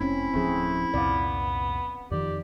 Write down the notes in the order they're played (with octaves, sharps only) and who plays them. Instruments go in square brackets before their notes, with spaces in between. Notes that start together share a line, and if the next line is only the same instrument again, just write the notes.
[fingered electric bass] F1 [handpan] C4 C#4 [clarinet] E4
[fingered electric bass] D1 F3 [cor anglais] A3 [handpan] C4 G#4
[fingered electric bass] C2 F2 A#2 [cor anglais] B3 [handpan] D5 F5
[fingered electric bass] F2 D#3 F3 [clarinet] G4 [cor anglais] D5